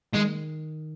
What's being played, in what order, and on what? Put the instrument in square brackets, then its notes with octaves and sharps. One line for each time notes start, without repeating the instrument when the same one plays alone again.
[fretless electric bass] D#3 [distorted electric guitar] G#3